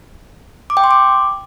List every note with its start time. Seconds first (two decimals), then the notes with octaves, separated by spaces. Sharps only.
0.70 D6
0.77 G5
0.84 C6
0.91 D6